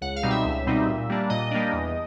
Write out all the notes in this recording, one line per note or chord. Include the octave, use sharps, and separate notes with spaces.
C#2 F#5
F5
B2 G3 C4 D#4
E5
C#2
B2 G3 C4 D#4
A#2
G3 A#3 D4
A#2 D#5
G3 A#3 D4
E2